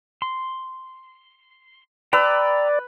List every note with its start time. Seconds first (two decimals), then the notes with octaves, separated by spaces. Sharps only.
0.22 C6
2.13 B4 D5 G5 A#5 E6